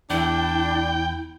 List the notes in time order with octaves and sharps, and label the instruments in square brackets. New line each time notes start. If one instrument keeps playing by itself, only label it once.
[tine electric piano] E2 E3 [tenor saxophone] D4 [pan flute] E4 [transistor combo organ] G5